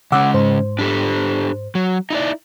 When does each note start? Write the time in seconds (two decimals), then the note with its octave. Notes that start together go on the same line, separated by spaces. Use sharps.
0.12 C#3 G#3 C#4 F#5 D6 E6
0.34 G#2 C5
0.79 D4 G4 A4
1.75 F#3
2.10 D#4 E4 D5